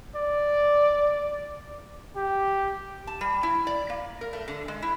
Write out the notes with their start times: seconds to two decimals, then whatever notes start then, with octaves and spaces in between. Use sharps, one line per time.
0.15 D5
2.16 G4
3.07 A5
3.21 G3
3.43 E4
3.67 D5
3.90 A#3
4.21 A#4
4.33 A3
4.48 D3
4.68 G#3
4.82 E4